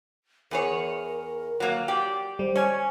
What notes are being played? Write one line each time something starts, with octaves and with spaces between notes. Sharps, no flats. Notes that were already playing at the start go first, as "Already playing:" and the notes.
E2 G#4 A#4 C#5
F#3 A#3
G4 D5
G3 C5
C#4 C#5 G#5